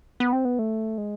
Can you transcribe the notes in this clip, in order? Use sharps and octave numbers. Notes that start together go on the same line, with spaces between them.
B3
C4
B3
A3
G#3